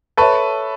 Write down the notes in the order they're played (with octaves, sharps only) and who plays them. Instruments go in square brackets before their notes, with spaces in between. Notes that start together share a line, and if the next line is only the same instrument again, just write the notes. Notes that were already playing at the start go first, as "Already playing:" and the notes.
[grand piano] A4 B4 [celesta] C#5 E5 A5 C#6